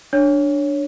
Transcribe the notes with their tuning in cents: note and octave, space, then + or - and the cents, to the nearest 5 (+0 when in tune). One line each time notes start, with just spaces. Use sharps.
D4 +0 C#5 +0